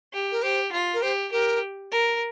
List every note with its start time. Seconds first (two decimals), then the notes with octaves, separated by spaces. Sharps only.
0.13 G4
0.32 A#4
0.43 G4 C5
0.72 F4
0.94 A#4
1.02 G4 C5
1.32 G4 A#4
1.92 A#4